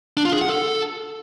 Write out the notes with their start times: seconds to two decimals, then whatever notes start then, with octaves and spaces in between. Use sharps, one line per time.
0.17 D4
0.25 F4
0.33 G#4
0.41 F#5
0.49 A4